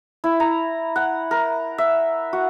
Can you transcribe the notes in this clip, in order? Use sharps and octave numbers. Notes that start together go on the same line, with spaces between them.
E4
A#5
F#5
A#4
E5
F#4